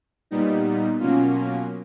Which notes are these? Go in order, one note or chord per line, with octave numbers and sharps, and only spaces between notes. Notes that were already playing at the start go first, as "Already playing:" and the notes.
A#2 G3 B3 D#4
B2 F#3 A#3 C#4 F4